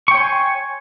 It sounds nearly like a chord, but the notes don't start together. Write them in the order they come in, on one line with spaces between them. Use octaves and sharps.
C#6 G5 C#5 C6 G#5